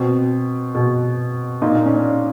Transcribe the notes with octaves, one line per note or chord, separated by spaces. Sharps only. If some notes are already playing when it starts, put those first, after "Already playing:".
Already playing: B2 C4
B2
A#2 D#4
D4
C#4
D4